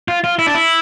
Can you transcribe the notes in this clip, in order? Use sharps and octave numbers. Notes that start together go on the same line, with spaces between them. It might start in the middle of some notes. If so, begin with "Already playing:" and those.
F4
F4
E4
D4
E4